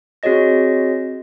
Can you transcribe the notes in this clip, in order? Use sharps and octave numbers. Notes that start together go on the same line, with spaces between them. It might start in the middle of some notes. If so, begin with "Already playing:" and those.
C4 F#4 G#4 C#5 D#5 A#6